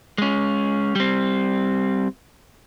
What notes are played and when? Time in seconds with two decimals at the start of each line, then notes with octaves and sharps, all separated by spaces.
0.18 G#3 C#4
0.95 G3 C4